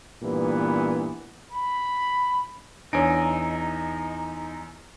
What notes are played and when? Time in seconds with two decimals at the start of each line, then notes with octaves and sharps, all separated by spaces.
0.23 G2 A#2 E3 B3
1.52 B5
2.93 E2 D4 D#4 C#5 G#5 D7